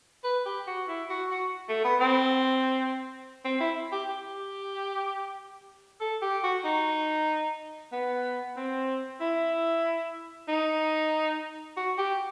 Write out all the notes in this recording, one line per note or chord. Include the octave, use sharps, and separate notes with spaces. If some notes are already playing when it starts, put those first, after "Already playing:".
B4
G4
F#4
E4
F#4
F#4
A3
B3
C4
C4
E4
G4
G4
A4
G4
F#4
D#4
B3
C4
E4
D#4
F#4
G4